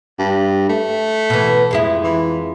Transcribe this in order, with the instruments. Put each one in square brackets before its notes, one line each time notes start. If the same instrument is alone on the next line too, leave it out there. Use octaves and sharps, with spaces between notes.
[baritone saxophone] G2
A3
[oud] B2 E3
F2 G#3 E4
[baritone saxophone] E3